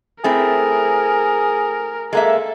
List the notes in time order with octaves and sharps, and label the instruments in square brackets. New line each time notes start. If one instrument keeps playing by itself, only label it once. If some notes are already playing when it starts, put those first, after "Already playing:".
[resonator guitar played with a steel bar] A3 C4 E4 [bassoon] G#4 [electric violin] A#4
[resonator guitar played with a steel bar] G#3 A#3 E5 [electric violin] A4